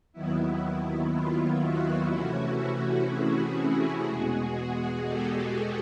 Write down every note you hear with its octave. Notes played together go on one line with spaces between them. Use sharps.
D#2 D#3 F#3 B3 E4
E4
F4
E4 F#4
C3 E3 A3 C#4
F#4 G#4
F#4 G#4
E2 B2 G#3
G4 A4